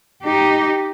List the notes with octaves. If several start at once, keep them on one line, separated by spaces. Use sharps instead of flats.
D#4 G4